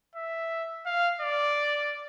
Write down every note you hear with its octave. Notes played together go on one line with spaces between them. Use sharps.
E5
F5
D5